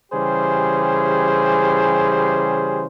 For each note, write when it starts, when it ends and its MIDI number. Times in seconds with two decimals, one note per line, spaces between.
0.12 2.86 49
0.12 2.86 52
0.12 2.86 55
0.12 2.86 67
0.12 2.86 68
0.12 2.86 72